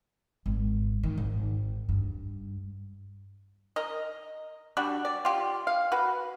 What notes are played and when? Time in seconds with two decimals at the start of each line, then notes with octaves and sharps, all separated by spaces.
0.46 G#1
1.03 D#3
1.18 G#1
1.89 G2
3.76 A#4 D#5
4.77 G3 D4 F#4
5.05 D5
5.25 F4 G4
5.67 F5
5.92 F#4 B4